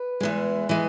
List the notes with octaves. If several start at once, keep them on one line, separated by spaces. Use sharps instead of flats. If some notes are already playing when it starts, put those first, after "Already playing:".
Already playing: B4
E2 E3 G#3
E3 G#3